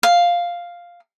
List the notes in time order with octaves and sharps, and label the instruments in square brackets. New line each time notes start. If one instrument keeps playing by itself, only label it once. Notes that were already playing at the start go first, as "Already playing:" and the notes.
[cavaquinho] F5